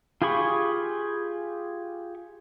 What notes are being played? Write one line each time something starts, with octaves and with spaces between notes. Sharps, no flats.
F4 G4 G#4 B5 C#6